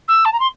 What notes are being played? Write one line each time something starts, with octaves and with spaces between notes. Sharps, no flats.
E6
A5
A#5
C6